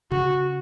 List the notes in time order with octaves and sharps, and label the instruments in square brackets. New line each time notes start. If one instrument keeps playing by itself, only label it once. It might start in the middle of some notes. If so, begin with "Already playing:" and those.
[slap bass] C#3 [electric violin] F#4